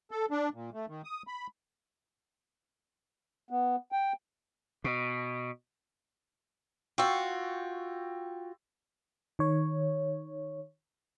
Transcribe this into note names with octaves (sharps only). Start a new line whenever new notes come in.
A4
D4
A#2
A3
D#3
D#6
B5
B3
G5
B2
F4 F#4 G5 C#6 E6
D#3 C#5